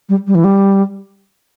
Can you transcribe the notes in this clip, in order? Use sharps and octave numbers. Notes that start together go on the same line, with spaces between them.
G3
G3
E3
G3